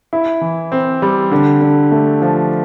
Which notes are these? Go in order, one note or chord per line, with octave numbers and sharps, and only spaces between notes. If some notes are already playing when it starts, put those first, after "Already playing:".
E4
E3
C4
G3
D3
D3
A3
F3